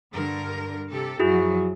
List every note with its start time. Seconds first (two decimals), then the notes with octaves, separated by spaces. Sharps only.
0.12 G2 D3 A#4
0.90 C3 G4 A4
1.19 F#2 F3 F#3 E4 F#4 G#4